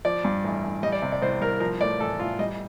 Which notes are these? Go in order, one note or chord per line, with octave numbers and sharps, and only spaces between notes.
F3 D5
G2
A1
A1
G3 D#5
D5
C3
D5
C2 C5
C2 A#4
F3 A#4
A2 D5
A1 A4
A1 F4
G3 D#5